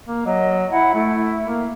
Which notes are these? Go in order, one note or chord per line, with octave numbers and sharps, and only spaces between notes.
A#3
F#3 D#5
E4 F#5
A3 E4
A#3